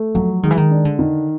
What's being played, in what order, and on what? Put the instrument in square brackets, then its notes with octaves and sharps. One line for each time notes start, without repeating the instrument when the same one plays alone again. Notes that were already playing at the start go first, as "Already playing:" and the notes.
Already playing: [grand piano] A3
[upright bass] F3 [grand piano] F#3
[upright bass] D#3 [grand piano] G#3
[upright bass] E3
D#3
[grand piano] D4
[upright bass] D3
[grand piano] D#3